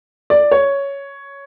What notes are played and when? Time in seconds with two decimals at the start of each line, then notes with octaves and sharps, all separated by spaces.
0.30 D5
0.52 C#5